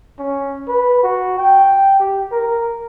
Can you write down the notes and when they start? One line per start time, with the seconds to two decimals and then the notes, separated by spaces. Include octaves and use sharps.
0.19 C#4
0.68 B4
1.03 F#4
1.38 G5
2.00 G4
2.32 A#4